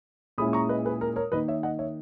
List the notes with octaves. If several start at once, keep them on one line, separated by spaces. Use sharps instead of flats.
A#2 G#3 C#4 E4 B5 D#6
A#5 C#6
B4 D#5
G#4 B4
A#4
A#4 C#5
D#3 A#3 D#4 B4 D#5
C#5 E5
D#5 F#5
C#5 E5